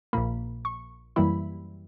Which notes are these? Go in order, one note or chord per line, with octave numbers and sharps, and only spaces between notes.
A#1 A#2 A#3 B5
C#6
F#2 E3 G3 A#3 E4 B5